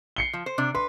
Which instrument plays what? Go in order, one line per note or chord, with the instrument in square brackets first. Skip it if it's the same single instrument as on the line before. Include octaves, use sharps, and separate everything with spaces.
[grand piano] C7 C#7 G7
[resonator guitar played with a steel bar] F3
C5
C3 D4
[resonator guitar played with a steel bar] B4 [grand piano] C6